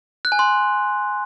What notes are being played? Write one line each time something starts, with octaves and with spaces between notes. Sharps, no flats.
F#6
G#5
C6